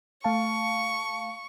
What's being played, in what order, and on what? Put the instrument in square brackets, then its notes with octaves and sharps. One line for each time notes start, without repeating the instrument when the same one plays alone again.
[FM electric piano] A3 F5 A5 [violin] C#6